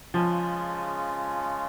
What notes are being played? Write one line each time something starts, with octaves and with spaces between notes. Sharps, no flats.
C#3 F3 G#3 C#4 F4